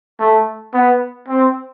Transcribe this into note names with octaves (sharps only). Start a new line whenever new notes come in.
A3
B3
C4